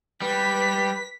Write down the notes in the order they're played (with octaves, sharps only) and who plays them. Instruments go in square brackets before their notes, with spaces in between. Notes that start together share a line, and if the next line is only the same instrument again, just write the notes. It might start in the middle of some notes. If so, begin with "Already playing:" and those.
[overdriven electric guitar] G3 [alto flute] B4 [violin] B6